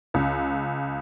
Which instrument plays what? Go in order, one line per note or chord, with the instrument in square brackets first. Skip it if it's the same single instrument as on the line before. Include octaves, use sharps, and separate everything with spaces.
[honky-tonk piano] C#2